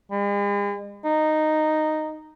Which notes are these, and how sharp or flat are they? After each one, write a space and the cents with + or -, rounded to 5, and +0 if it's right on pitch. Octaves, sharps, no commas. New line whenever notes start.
G#3 -45
D#4 -10